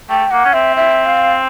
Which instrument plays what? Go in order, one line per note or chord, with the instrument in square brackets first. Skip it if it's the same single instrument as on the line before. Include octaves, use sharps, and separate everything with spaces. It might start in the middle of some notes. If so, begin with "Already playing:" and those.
[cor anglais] A3 [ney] G5
[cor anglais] A#3 [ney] F#5
[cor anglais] C#4
[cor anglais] C4 [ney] E5
[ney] E5
F5